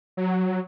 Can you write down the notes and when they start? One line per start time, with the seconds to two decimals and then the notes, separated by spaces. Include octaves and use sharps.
0.17 F#3